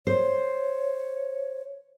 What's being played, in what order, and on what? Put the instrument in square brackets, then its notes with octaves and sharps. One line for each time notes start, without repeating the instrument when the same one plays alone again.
[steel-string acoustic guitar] C5 [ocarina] C#5